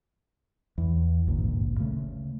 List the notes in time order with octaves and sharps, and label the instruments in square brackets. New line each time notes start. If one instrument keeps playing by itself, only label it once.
[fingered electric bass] E2
G#1 D2 G2 A#2
C#3 A3